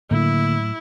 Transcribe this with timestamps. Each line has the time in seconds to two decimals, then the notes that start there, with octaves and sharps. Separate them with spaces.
0.11 A2 D3 F#3 A3 A#3 E4